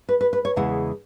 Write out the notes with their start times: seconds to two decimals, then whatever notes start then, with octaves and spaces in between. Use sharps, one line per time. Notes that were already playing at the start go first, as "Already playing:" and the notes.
0.09 B4
0.21 B4
0.33 B4
0.45 C#5
0.56 E2 C#3 G#3 E4 F#5